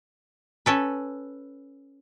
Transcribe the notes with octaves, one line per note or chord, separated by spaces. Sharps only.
C#4 A4 B4